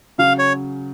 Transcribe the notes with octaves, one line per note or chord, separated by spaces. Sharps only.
C#3 F#3 C#4 F5
C#5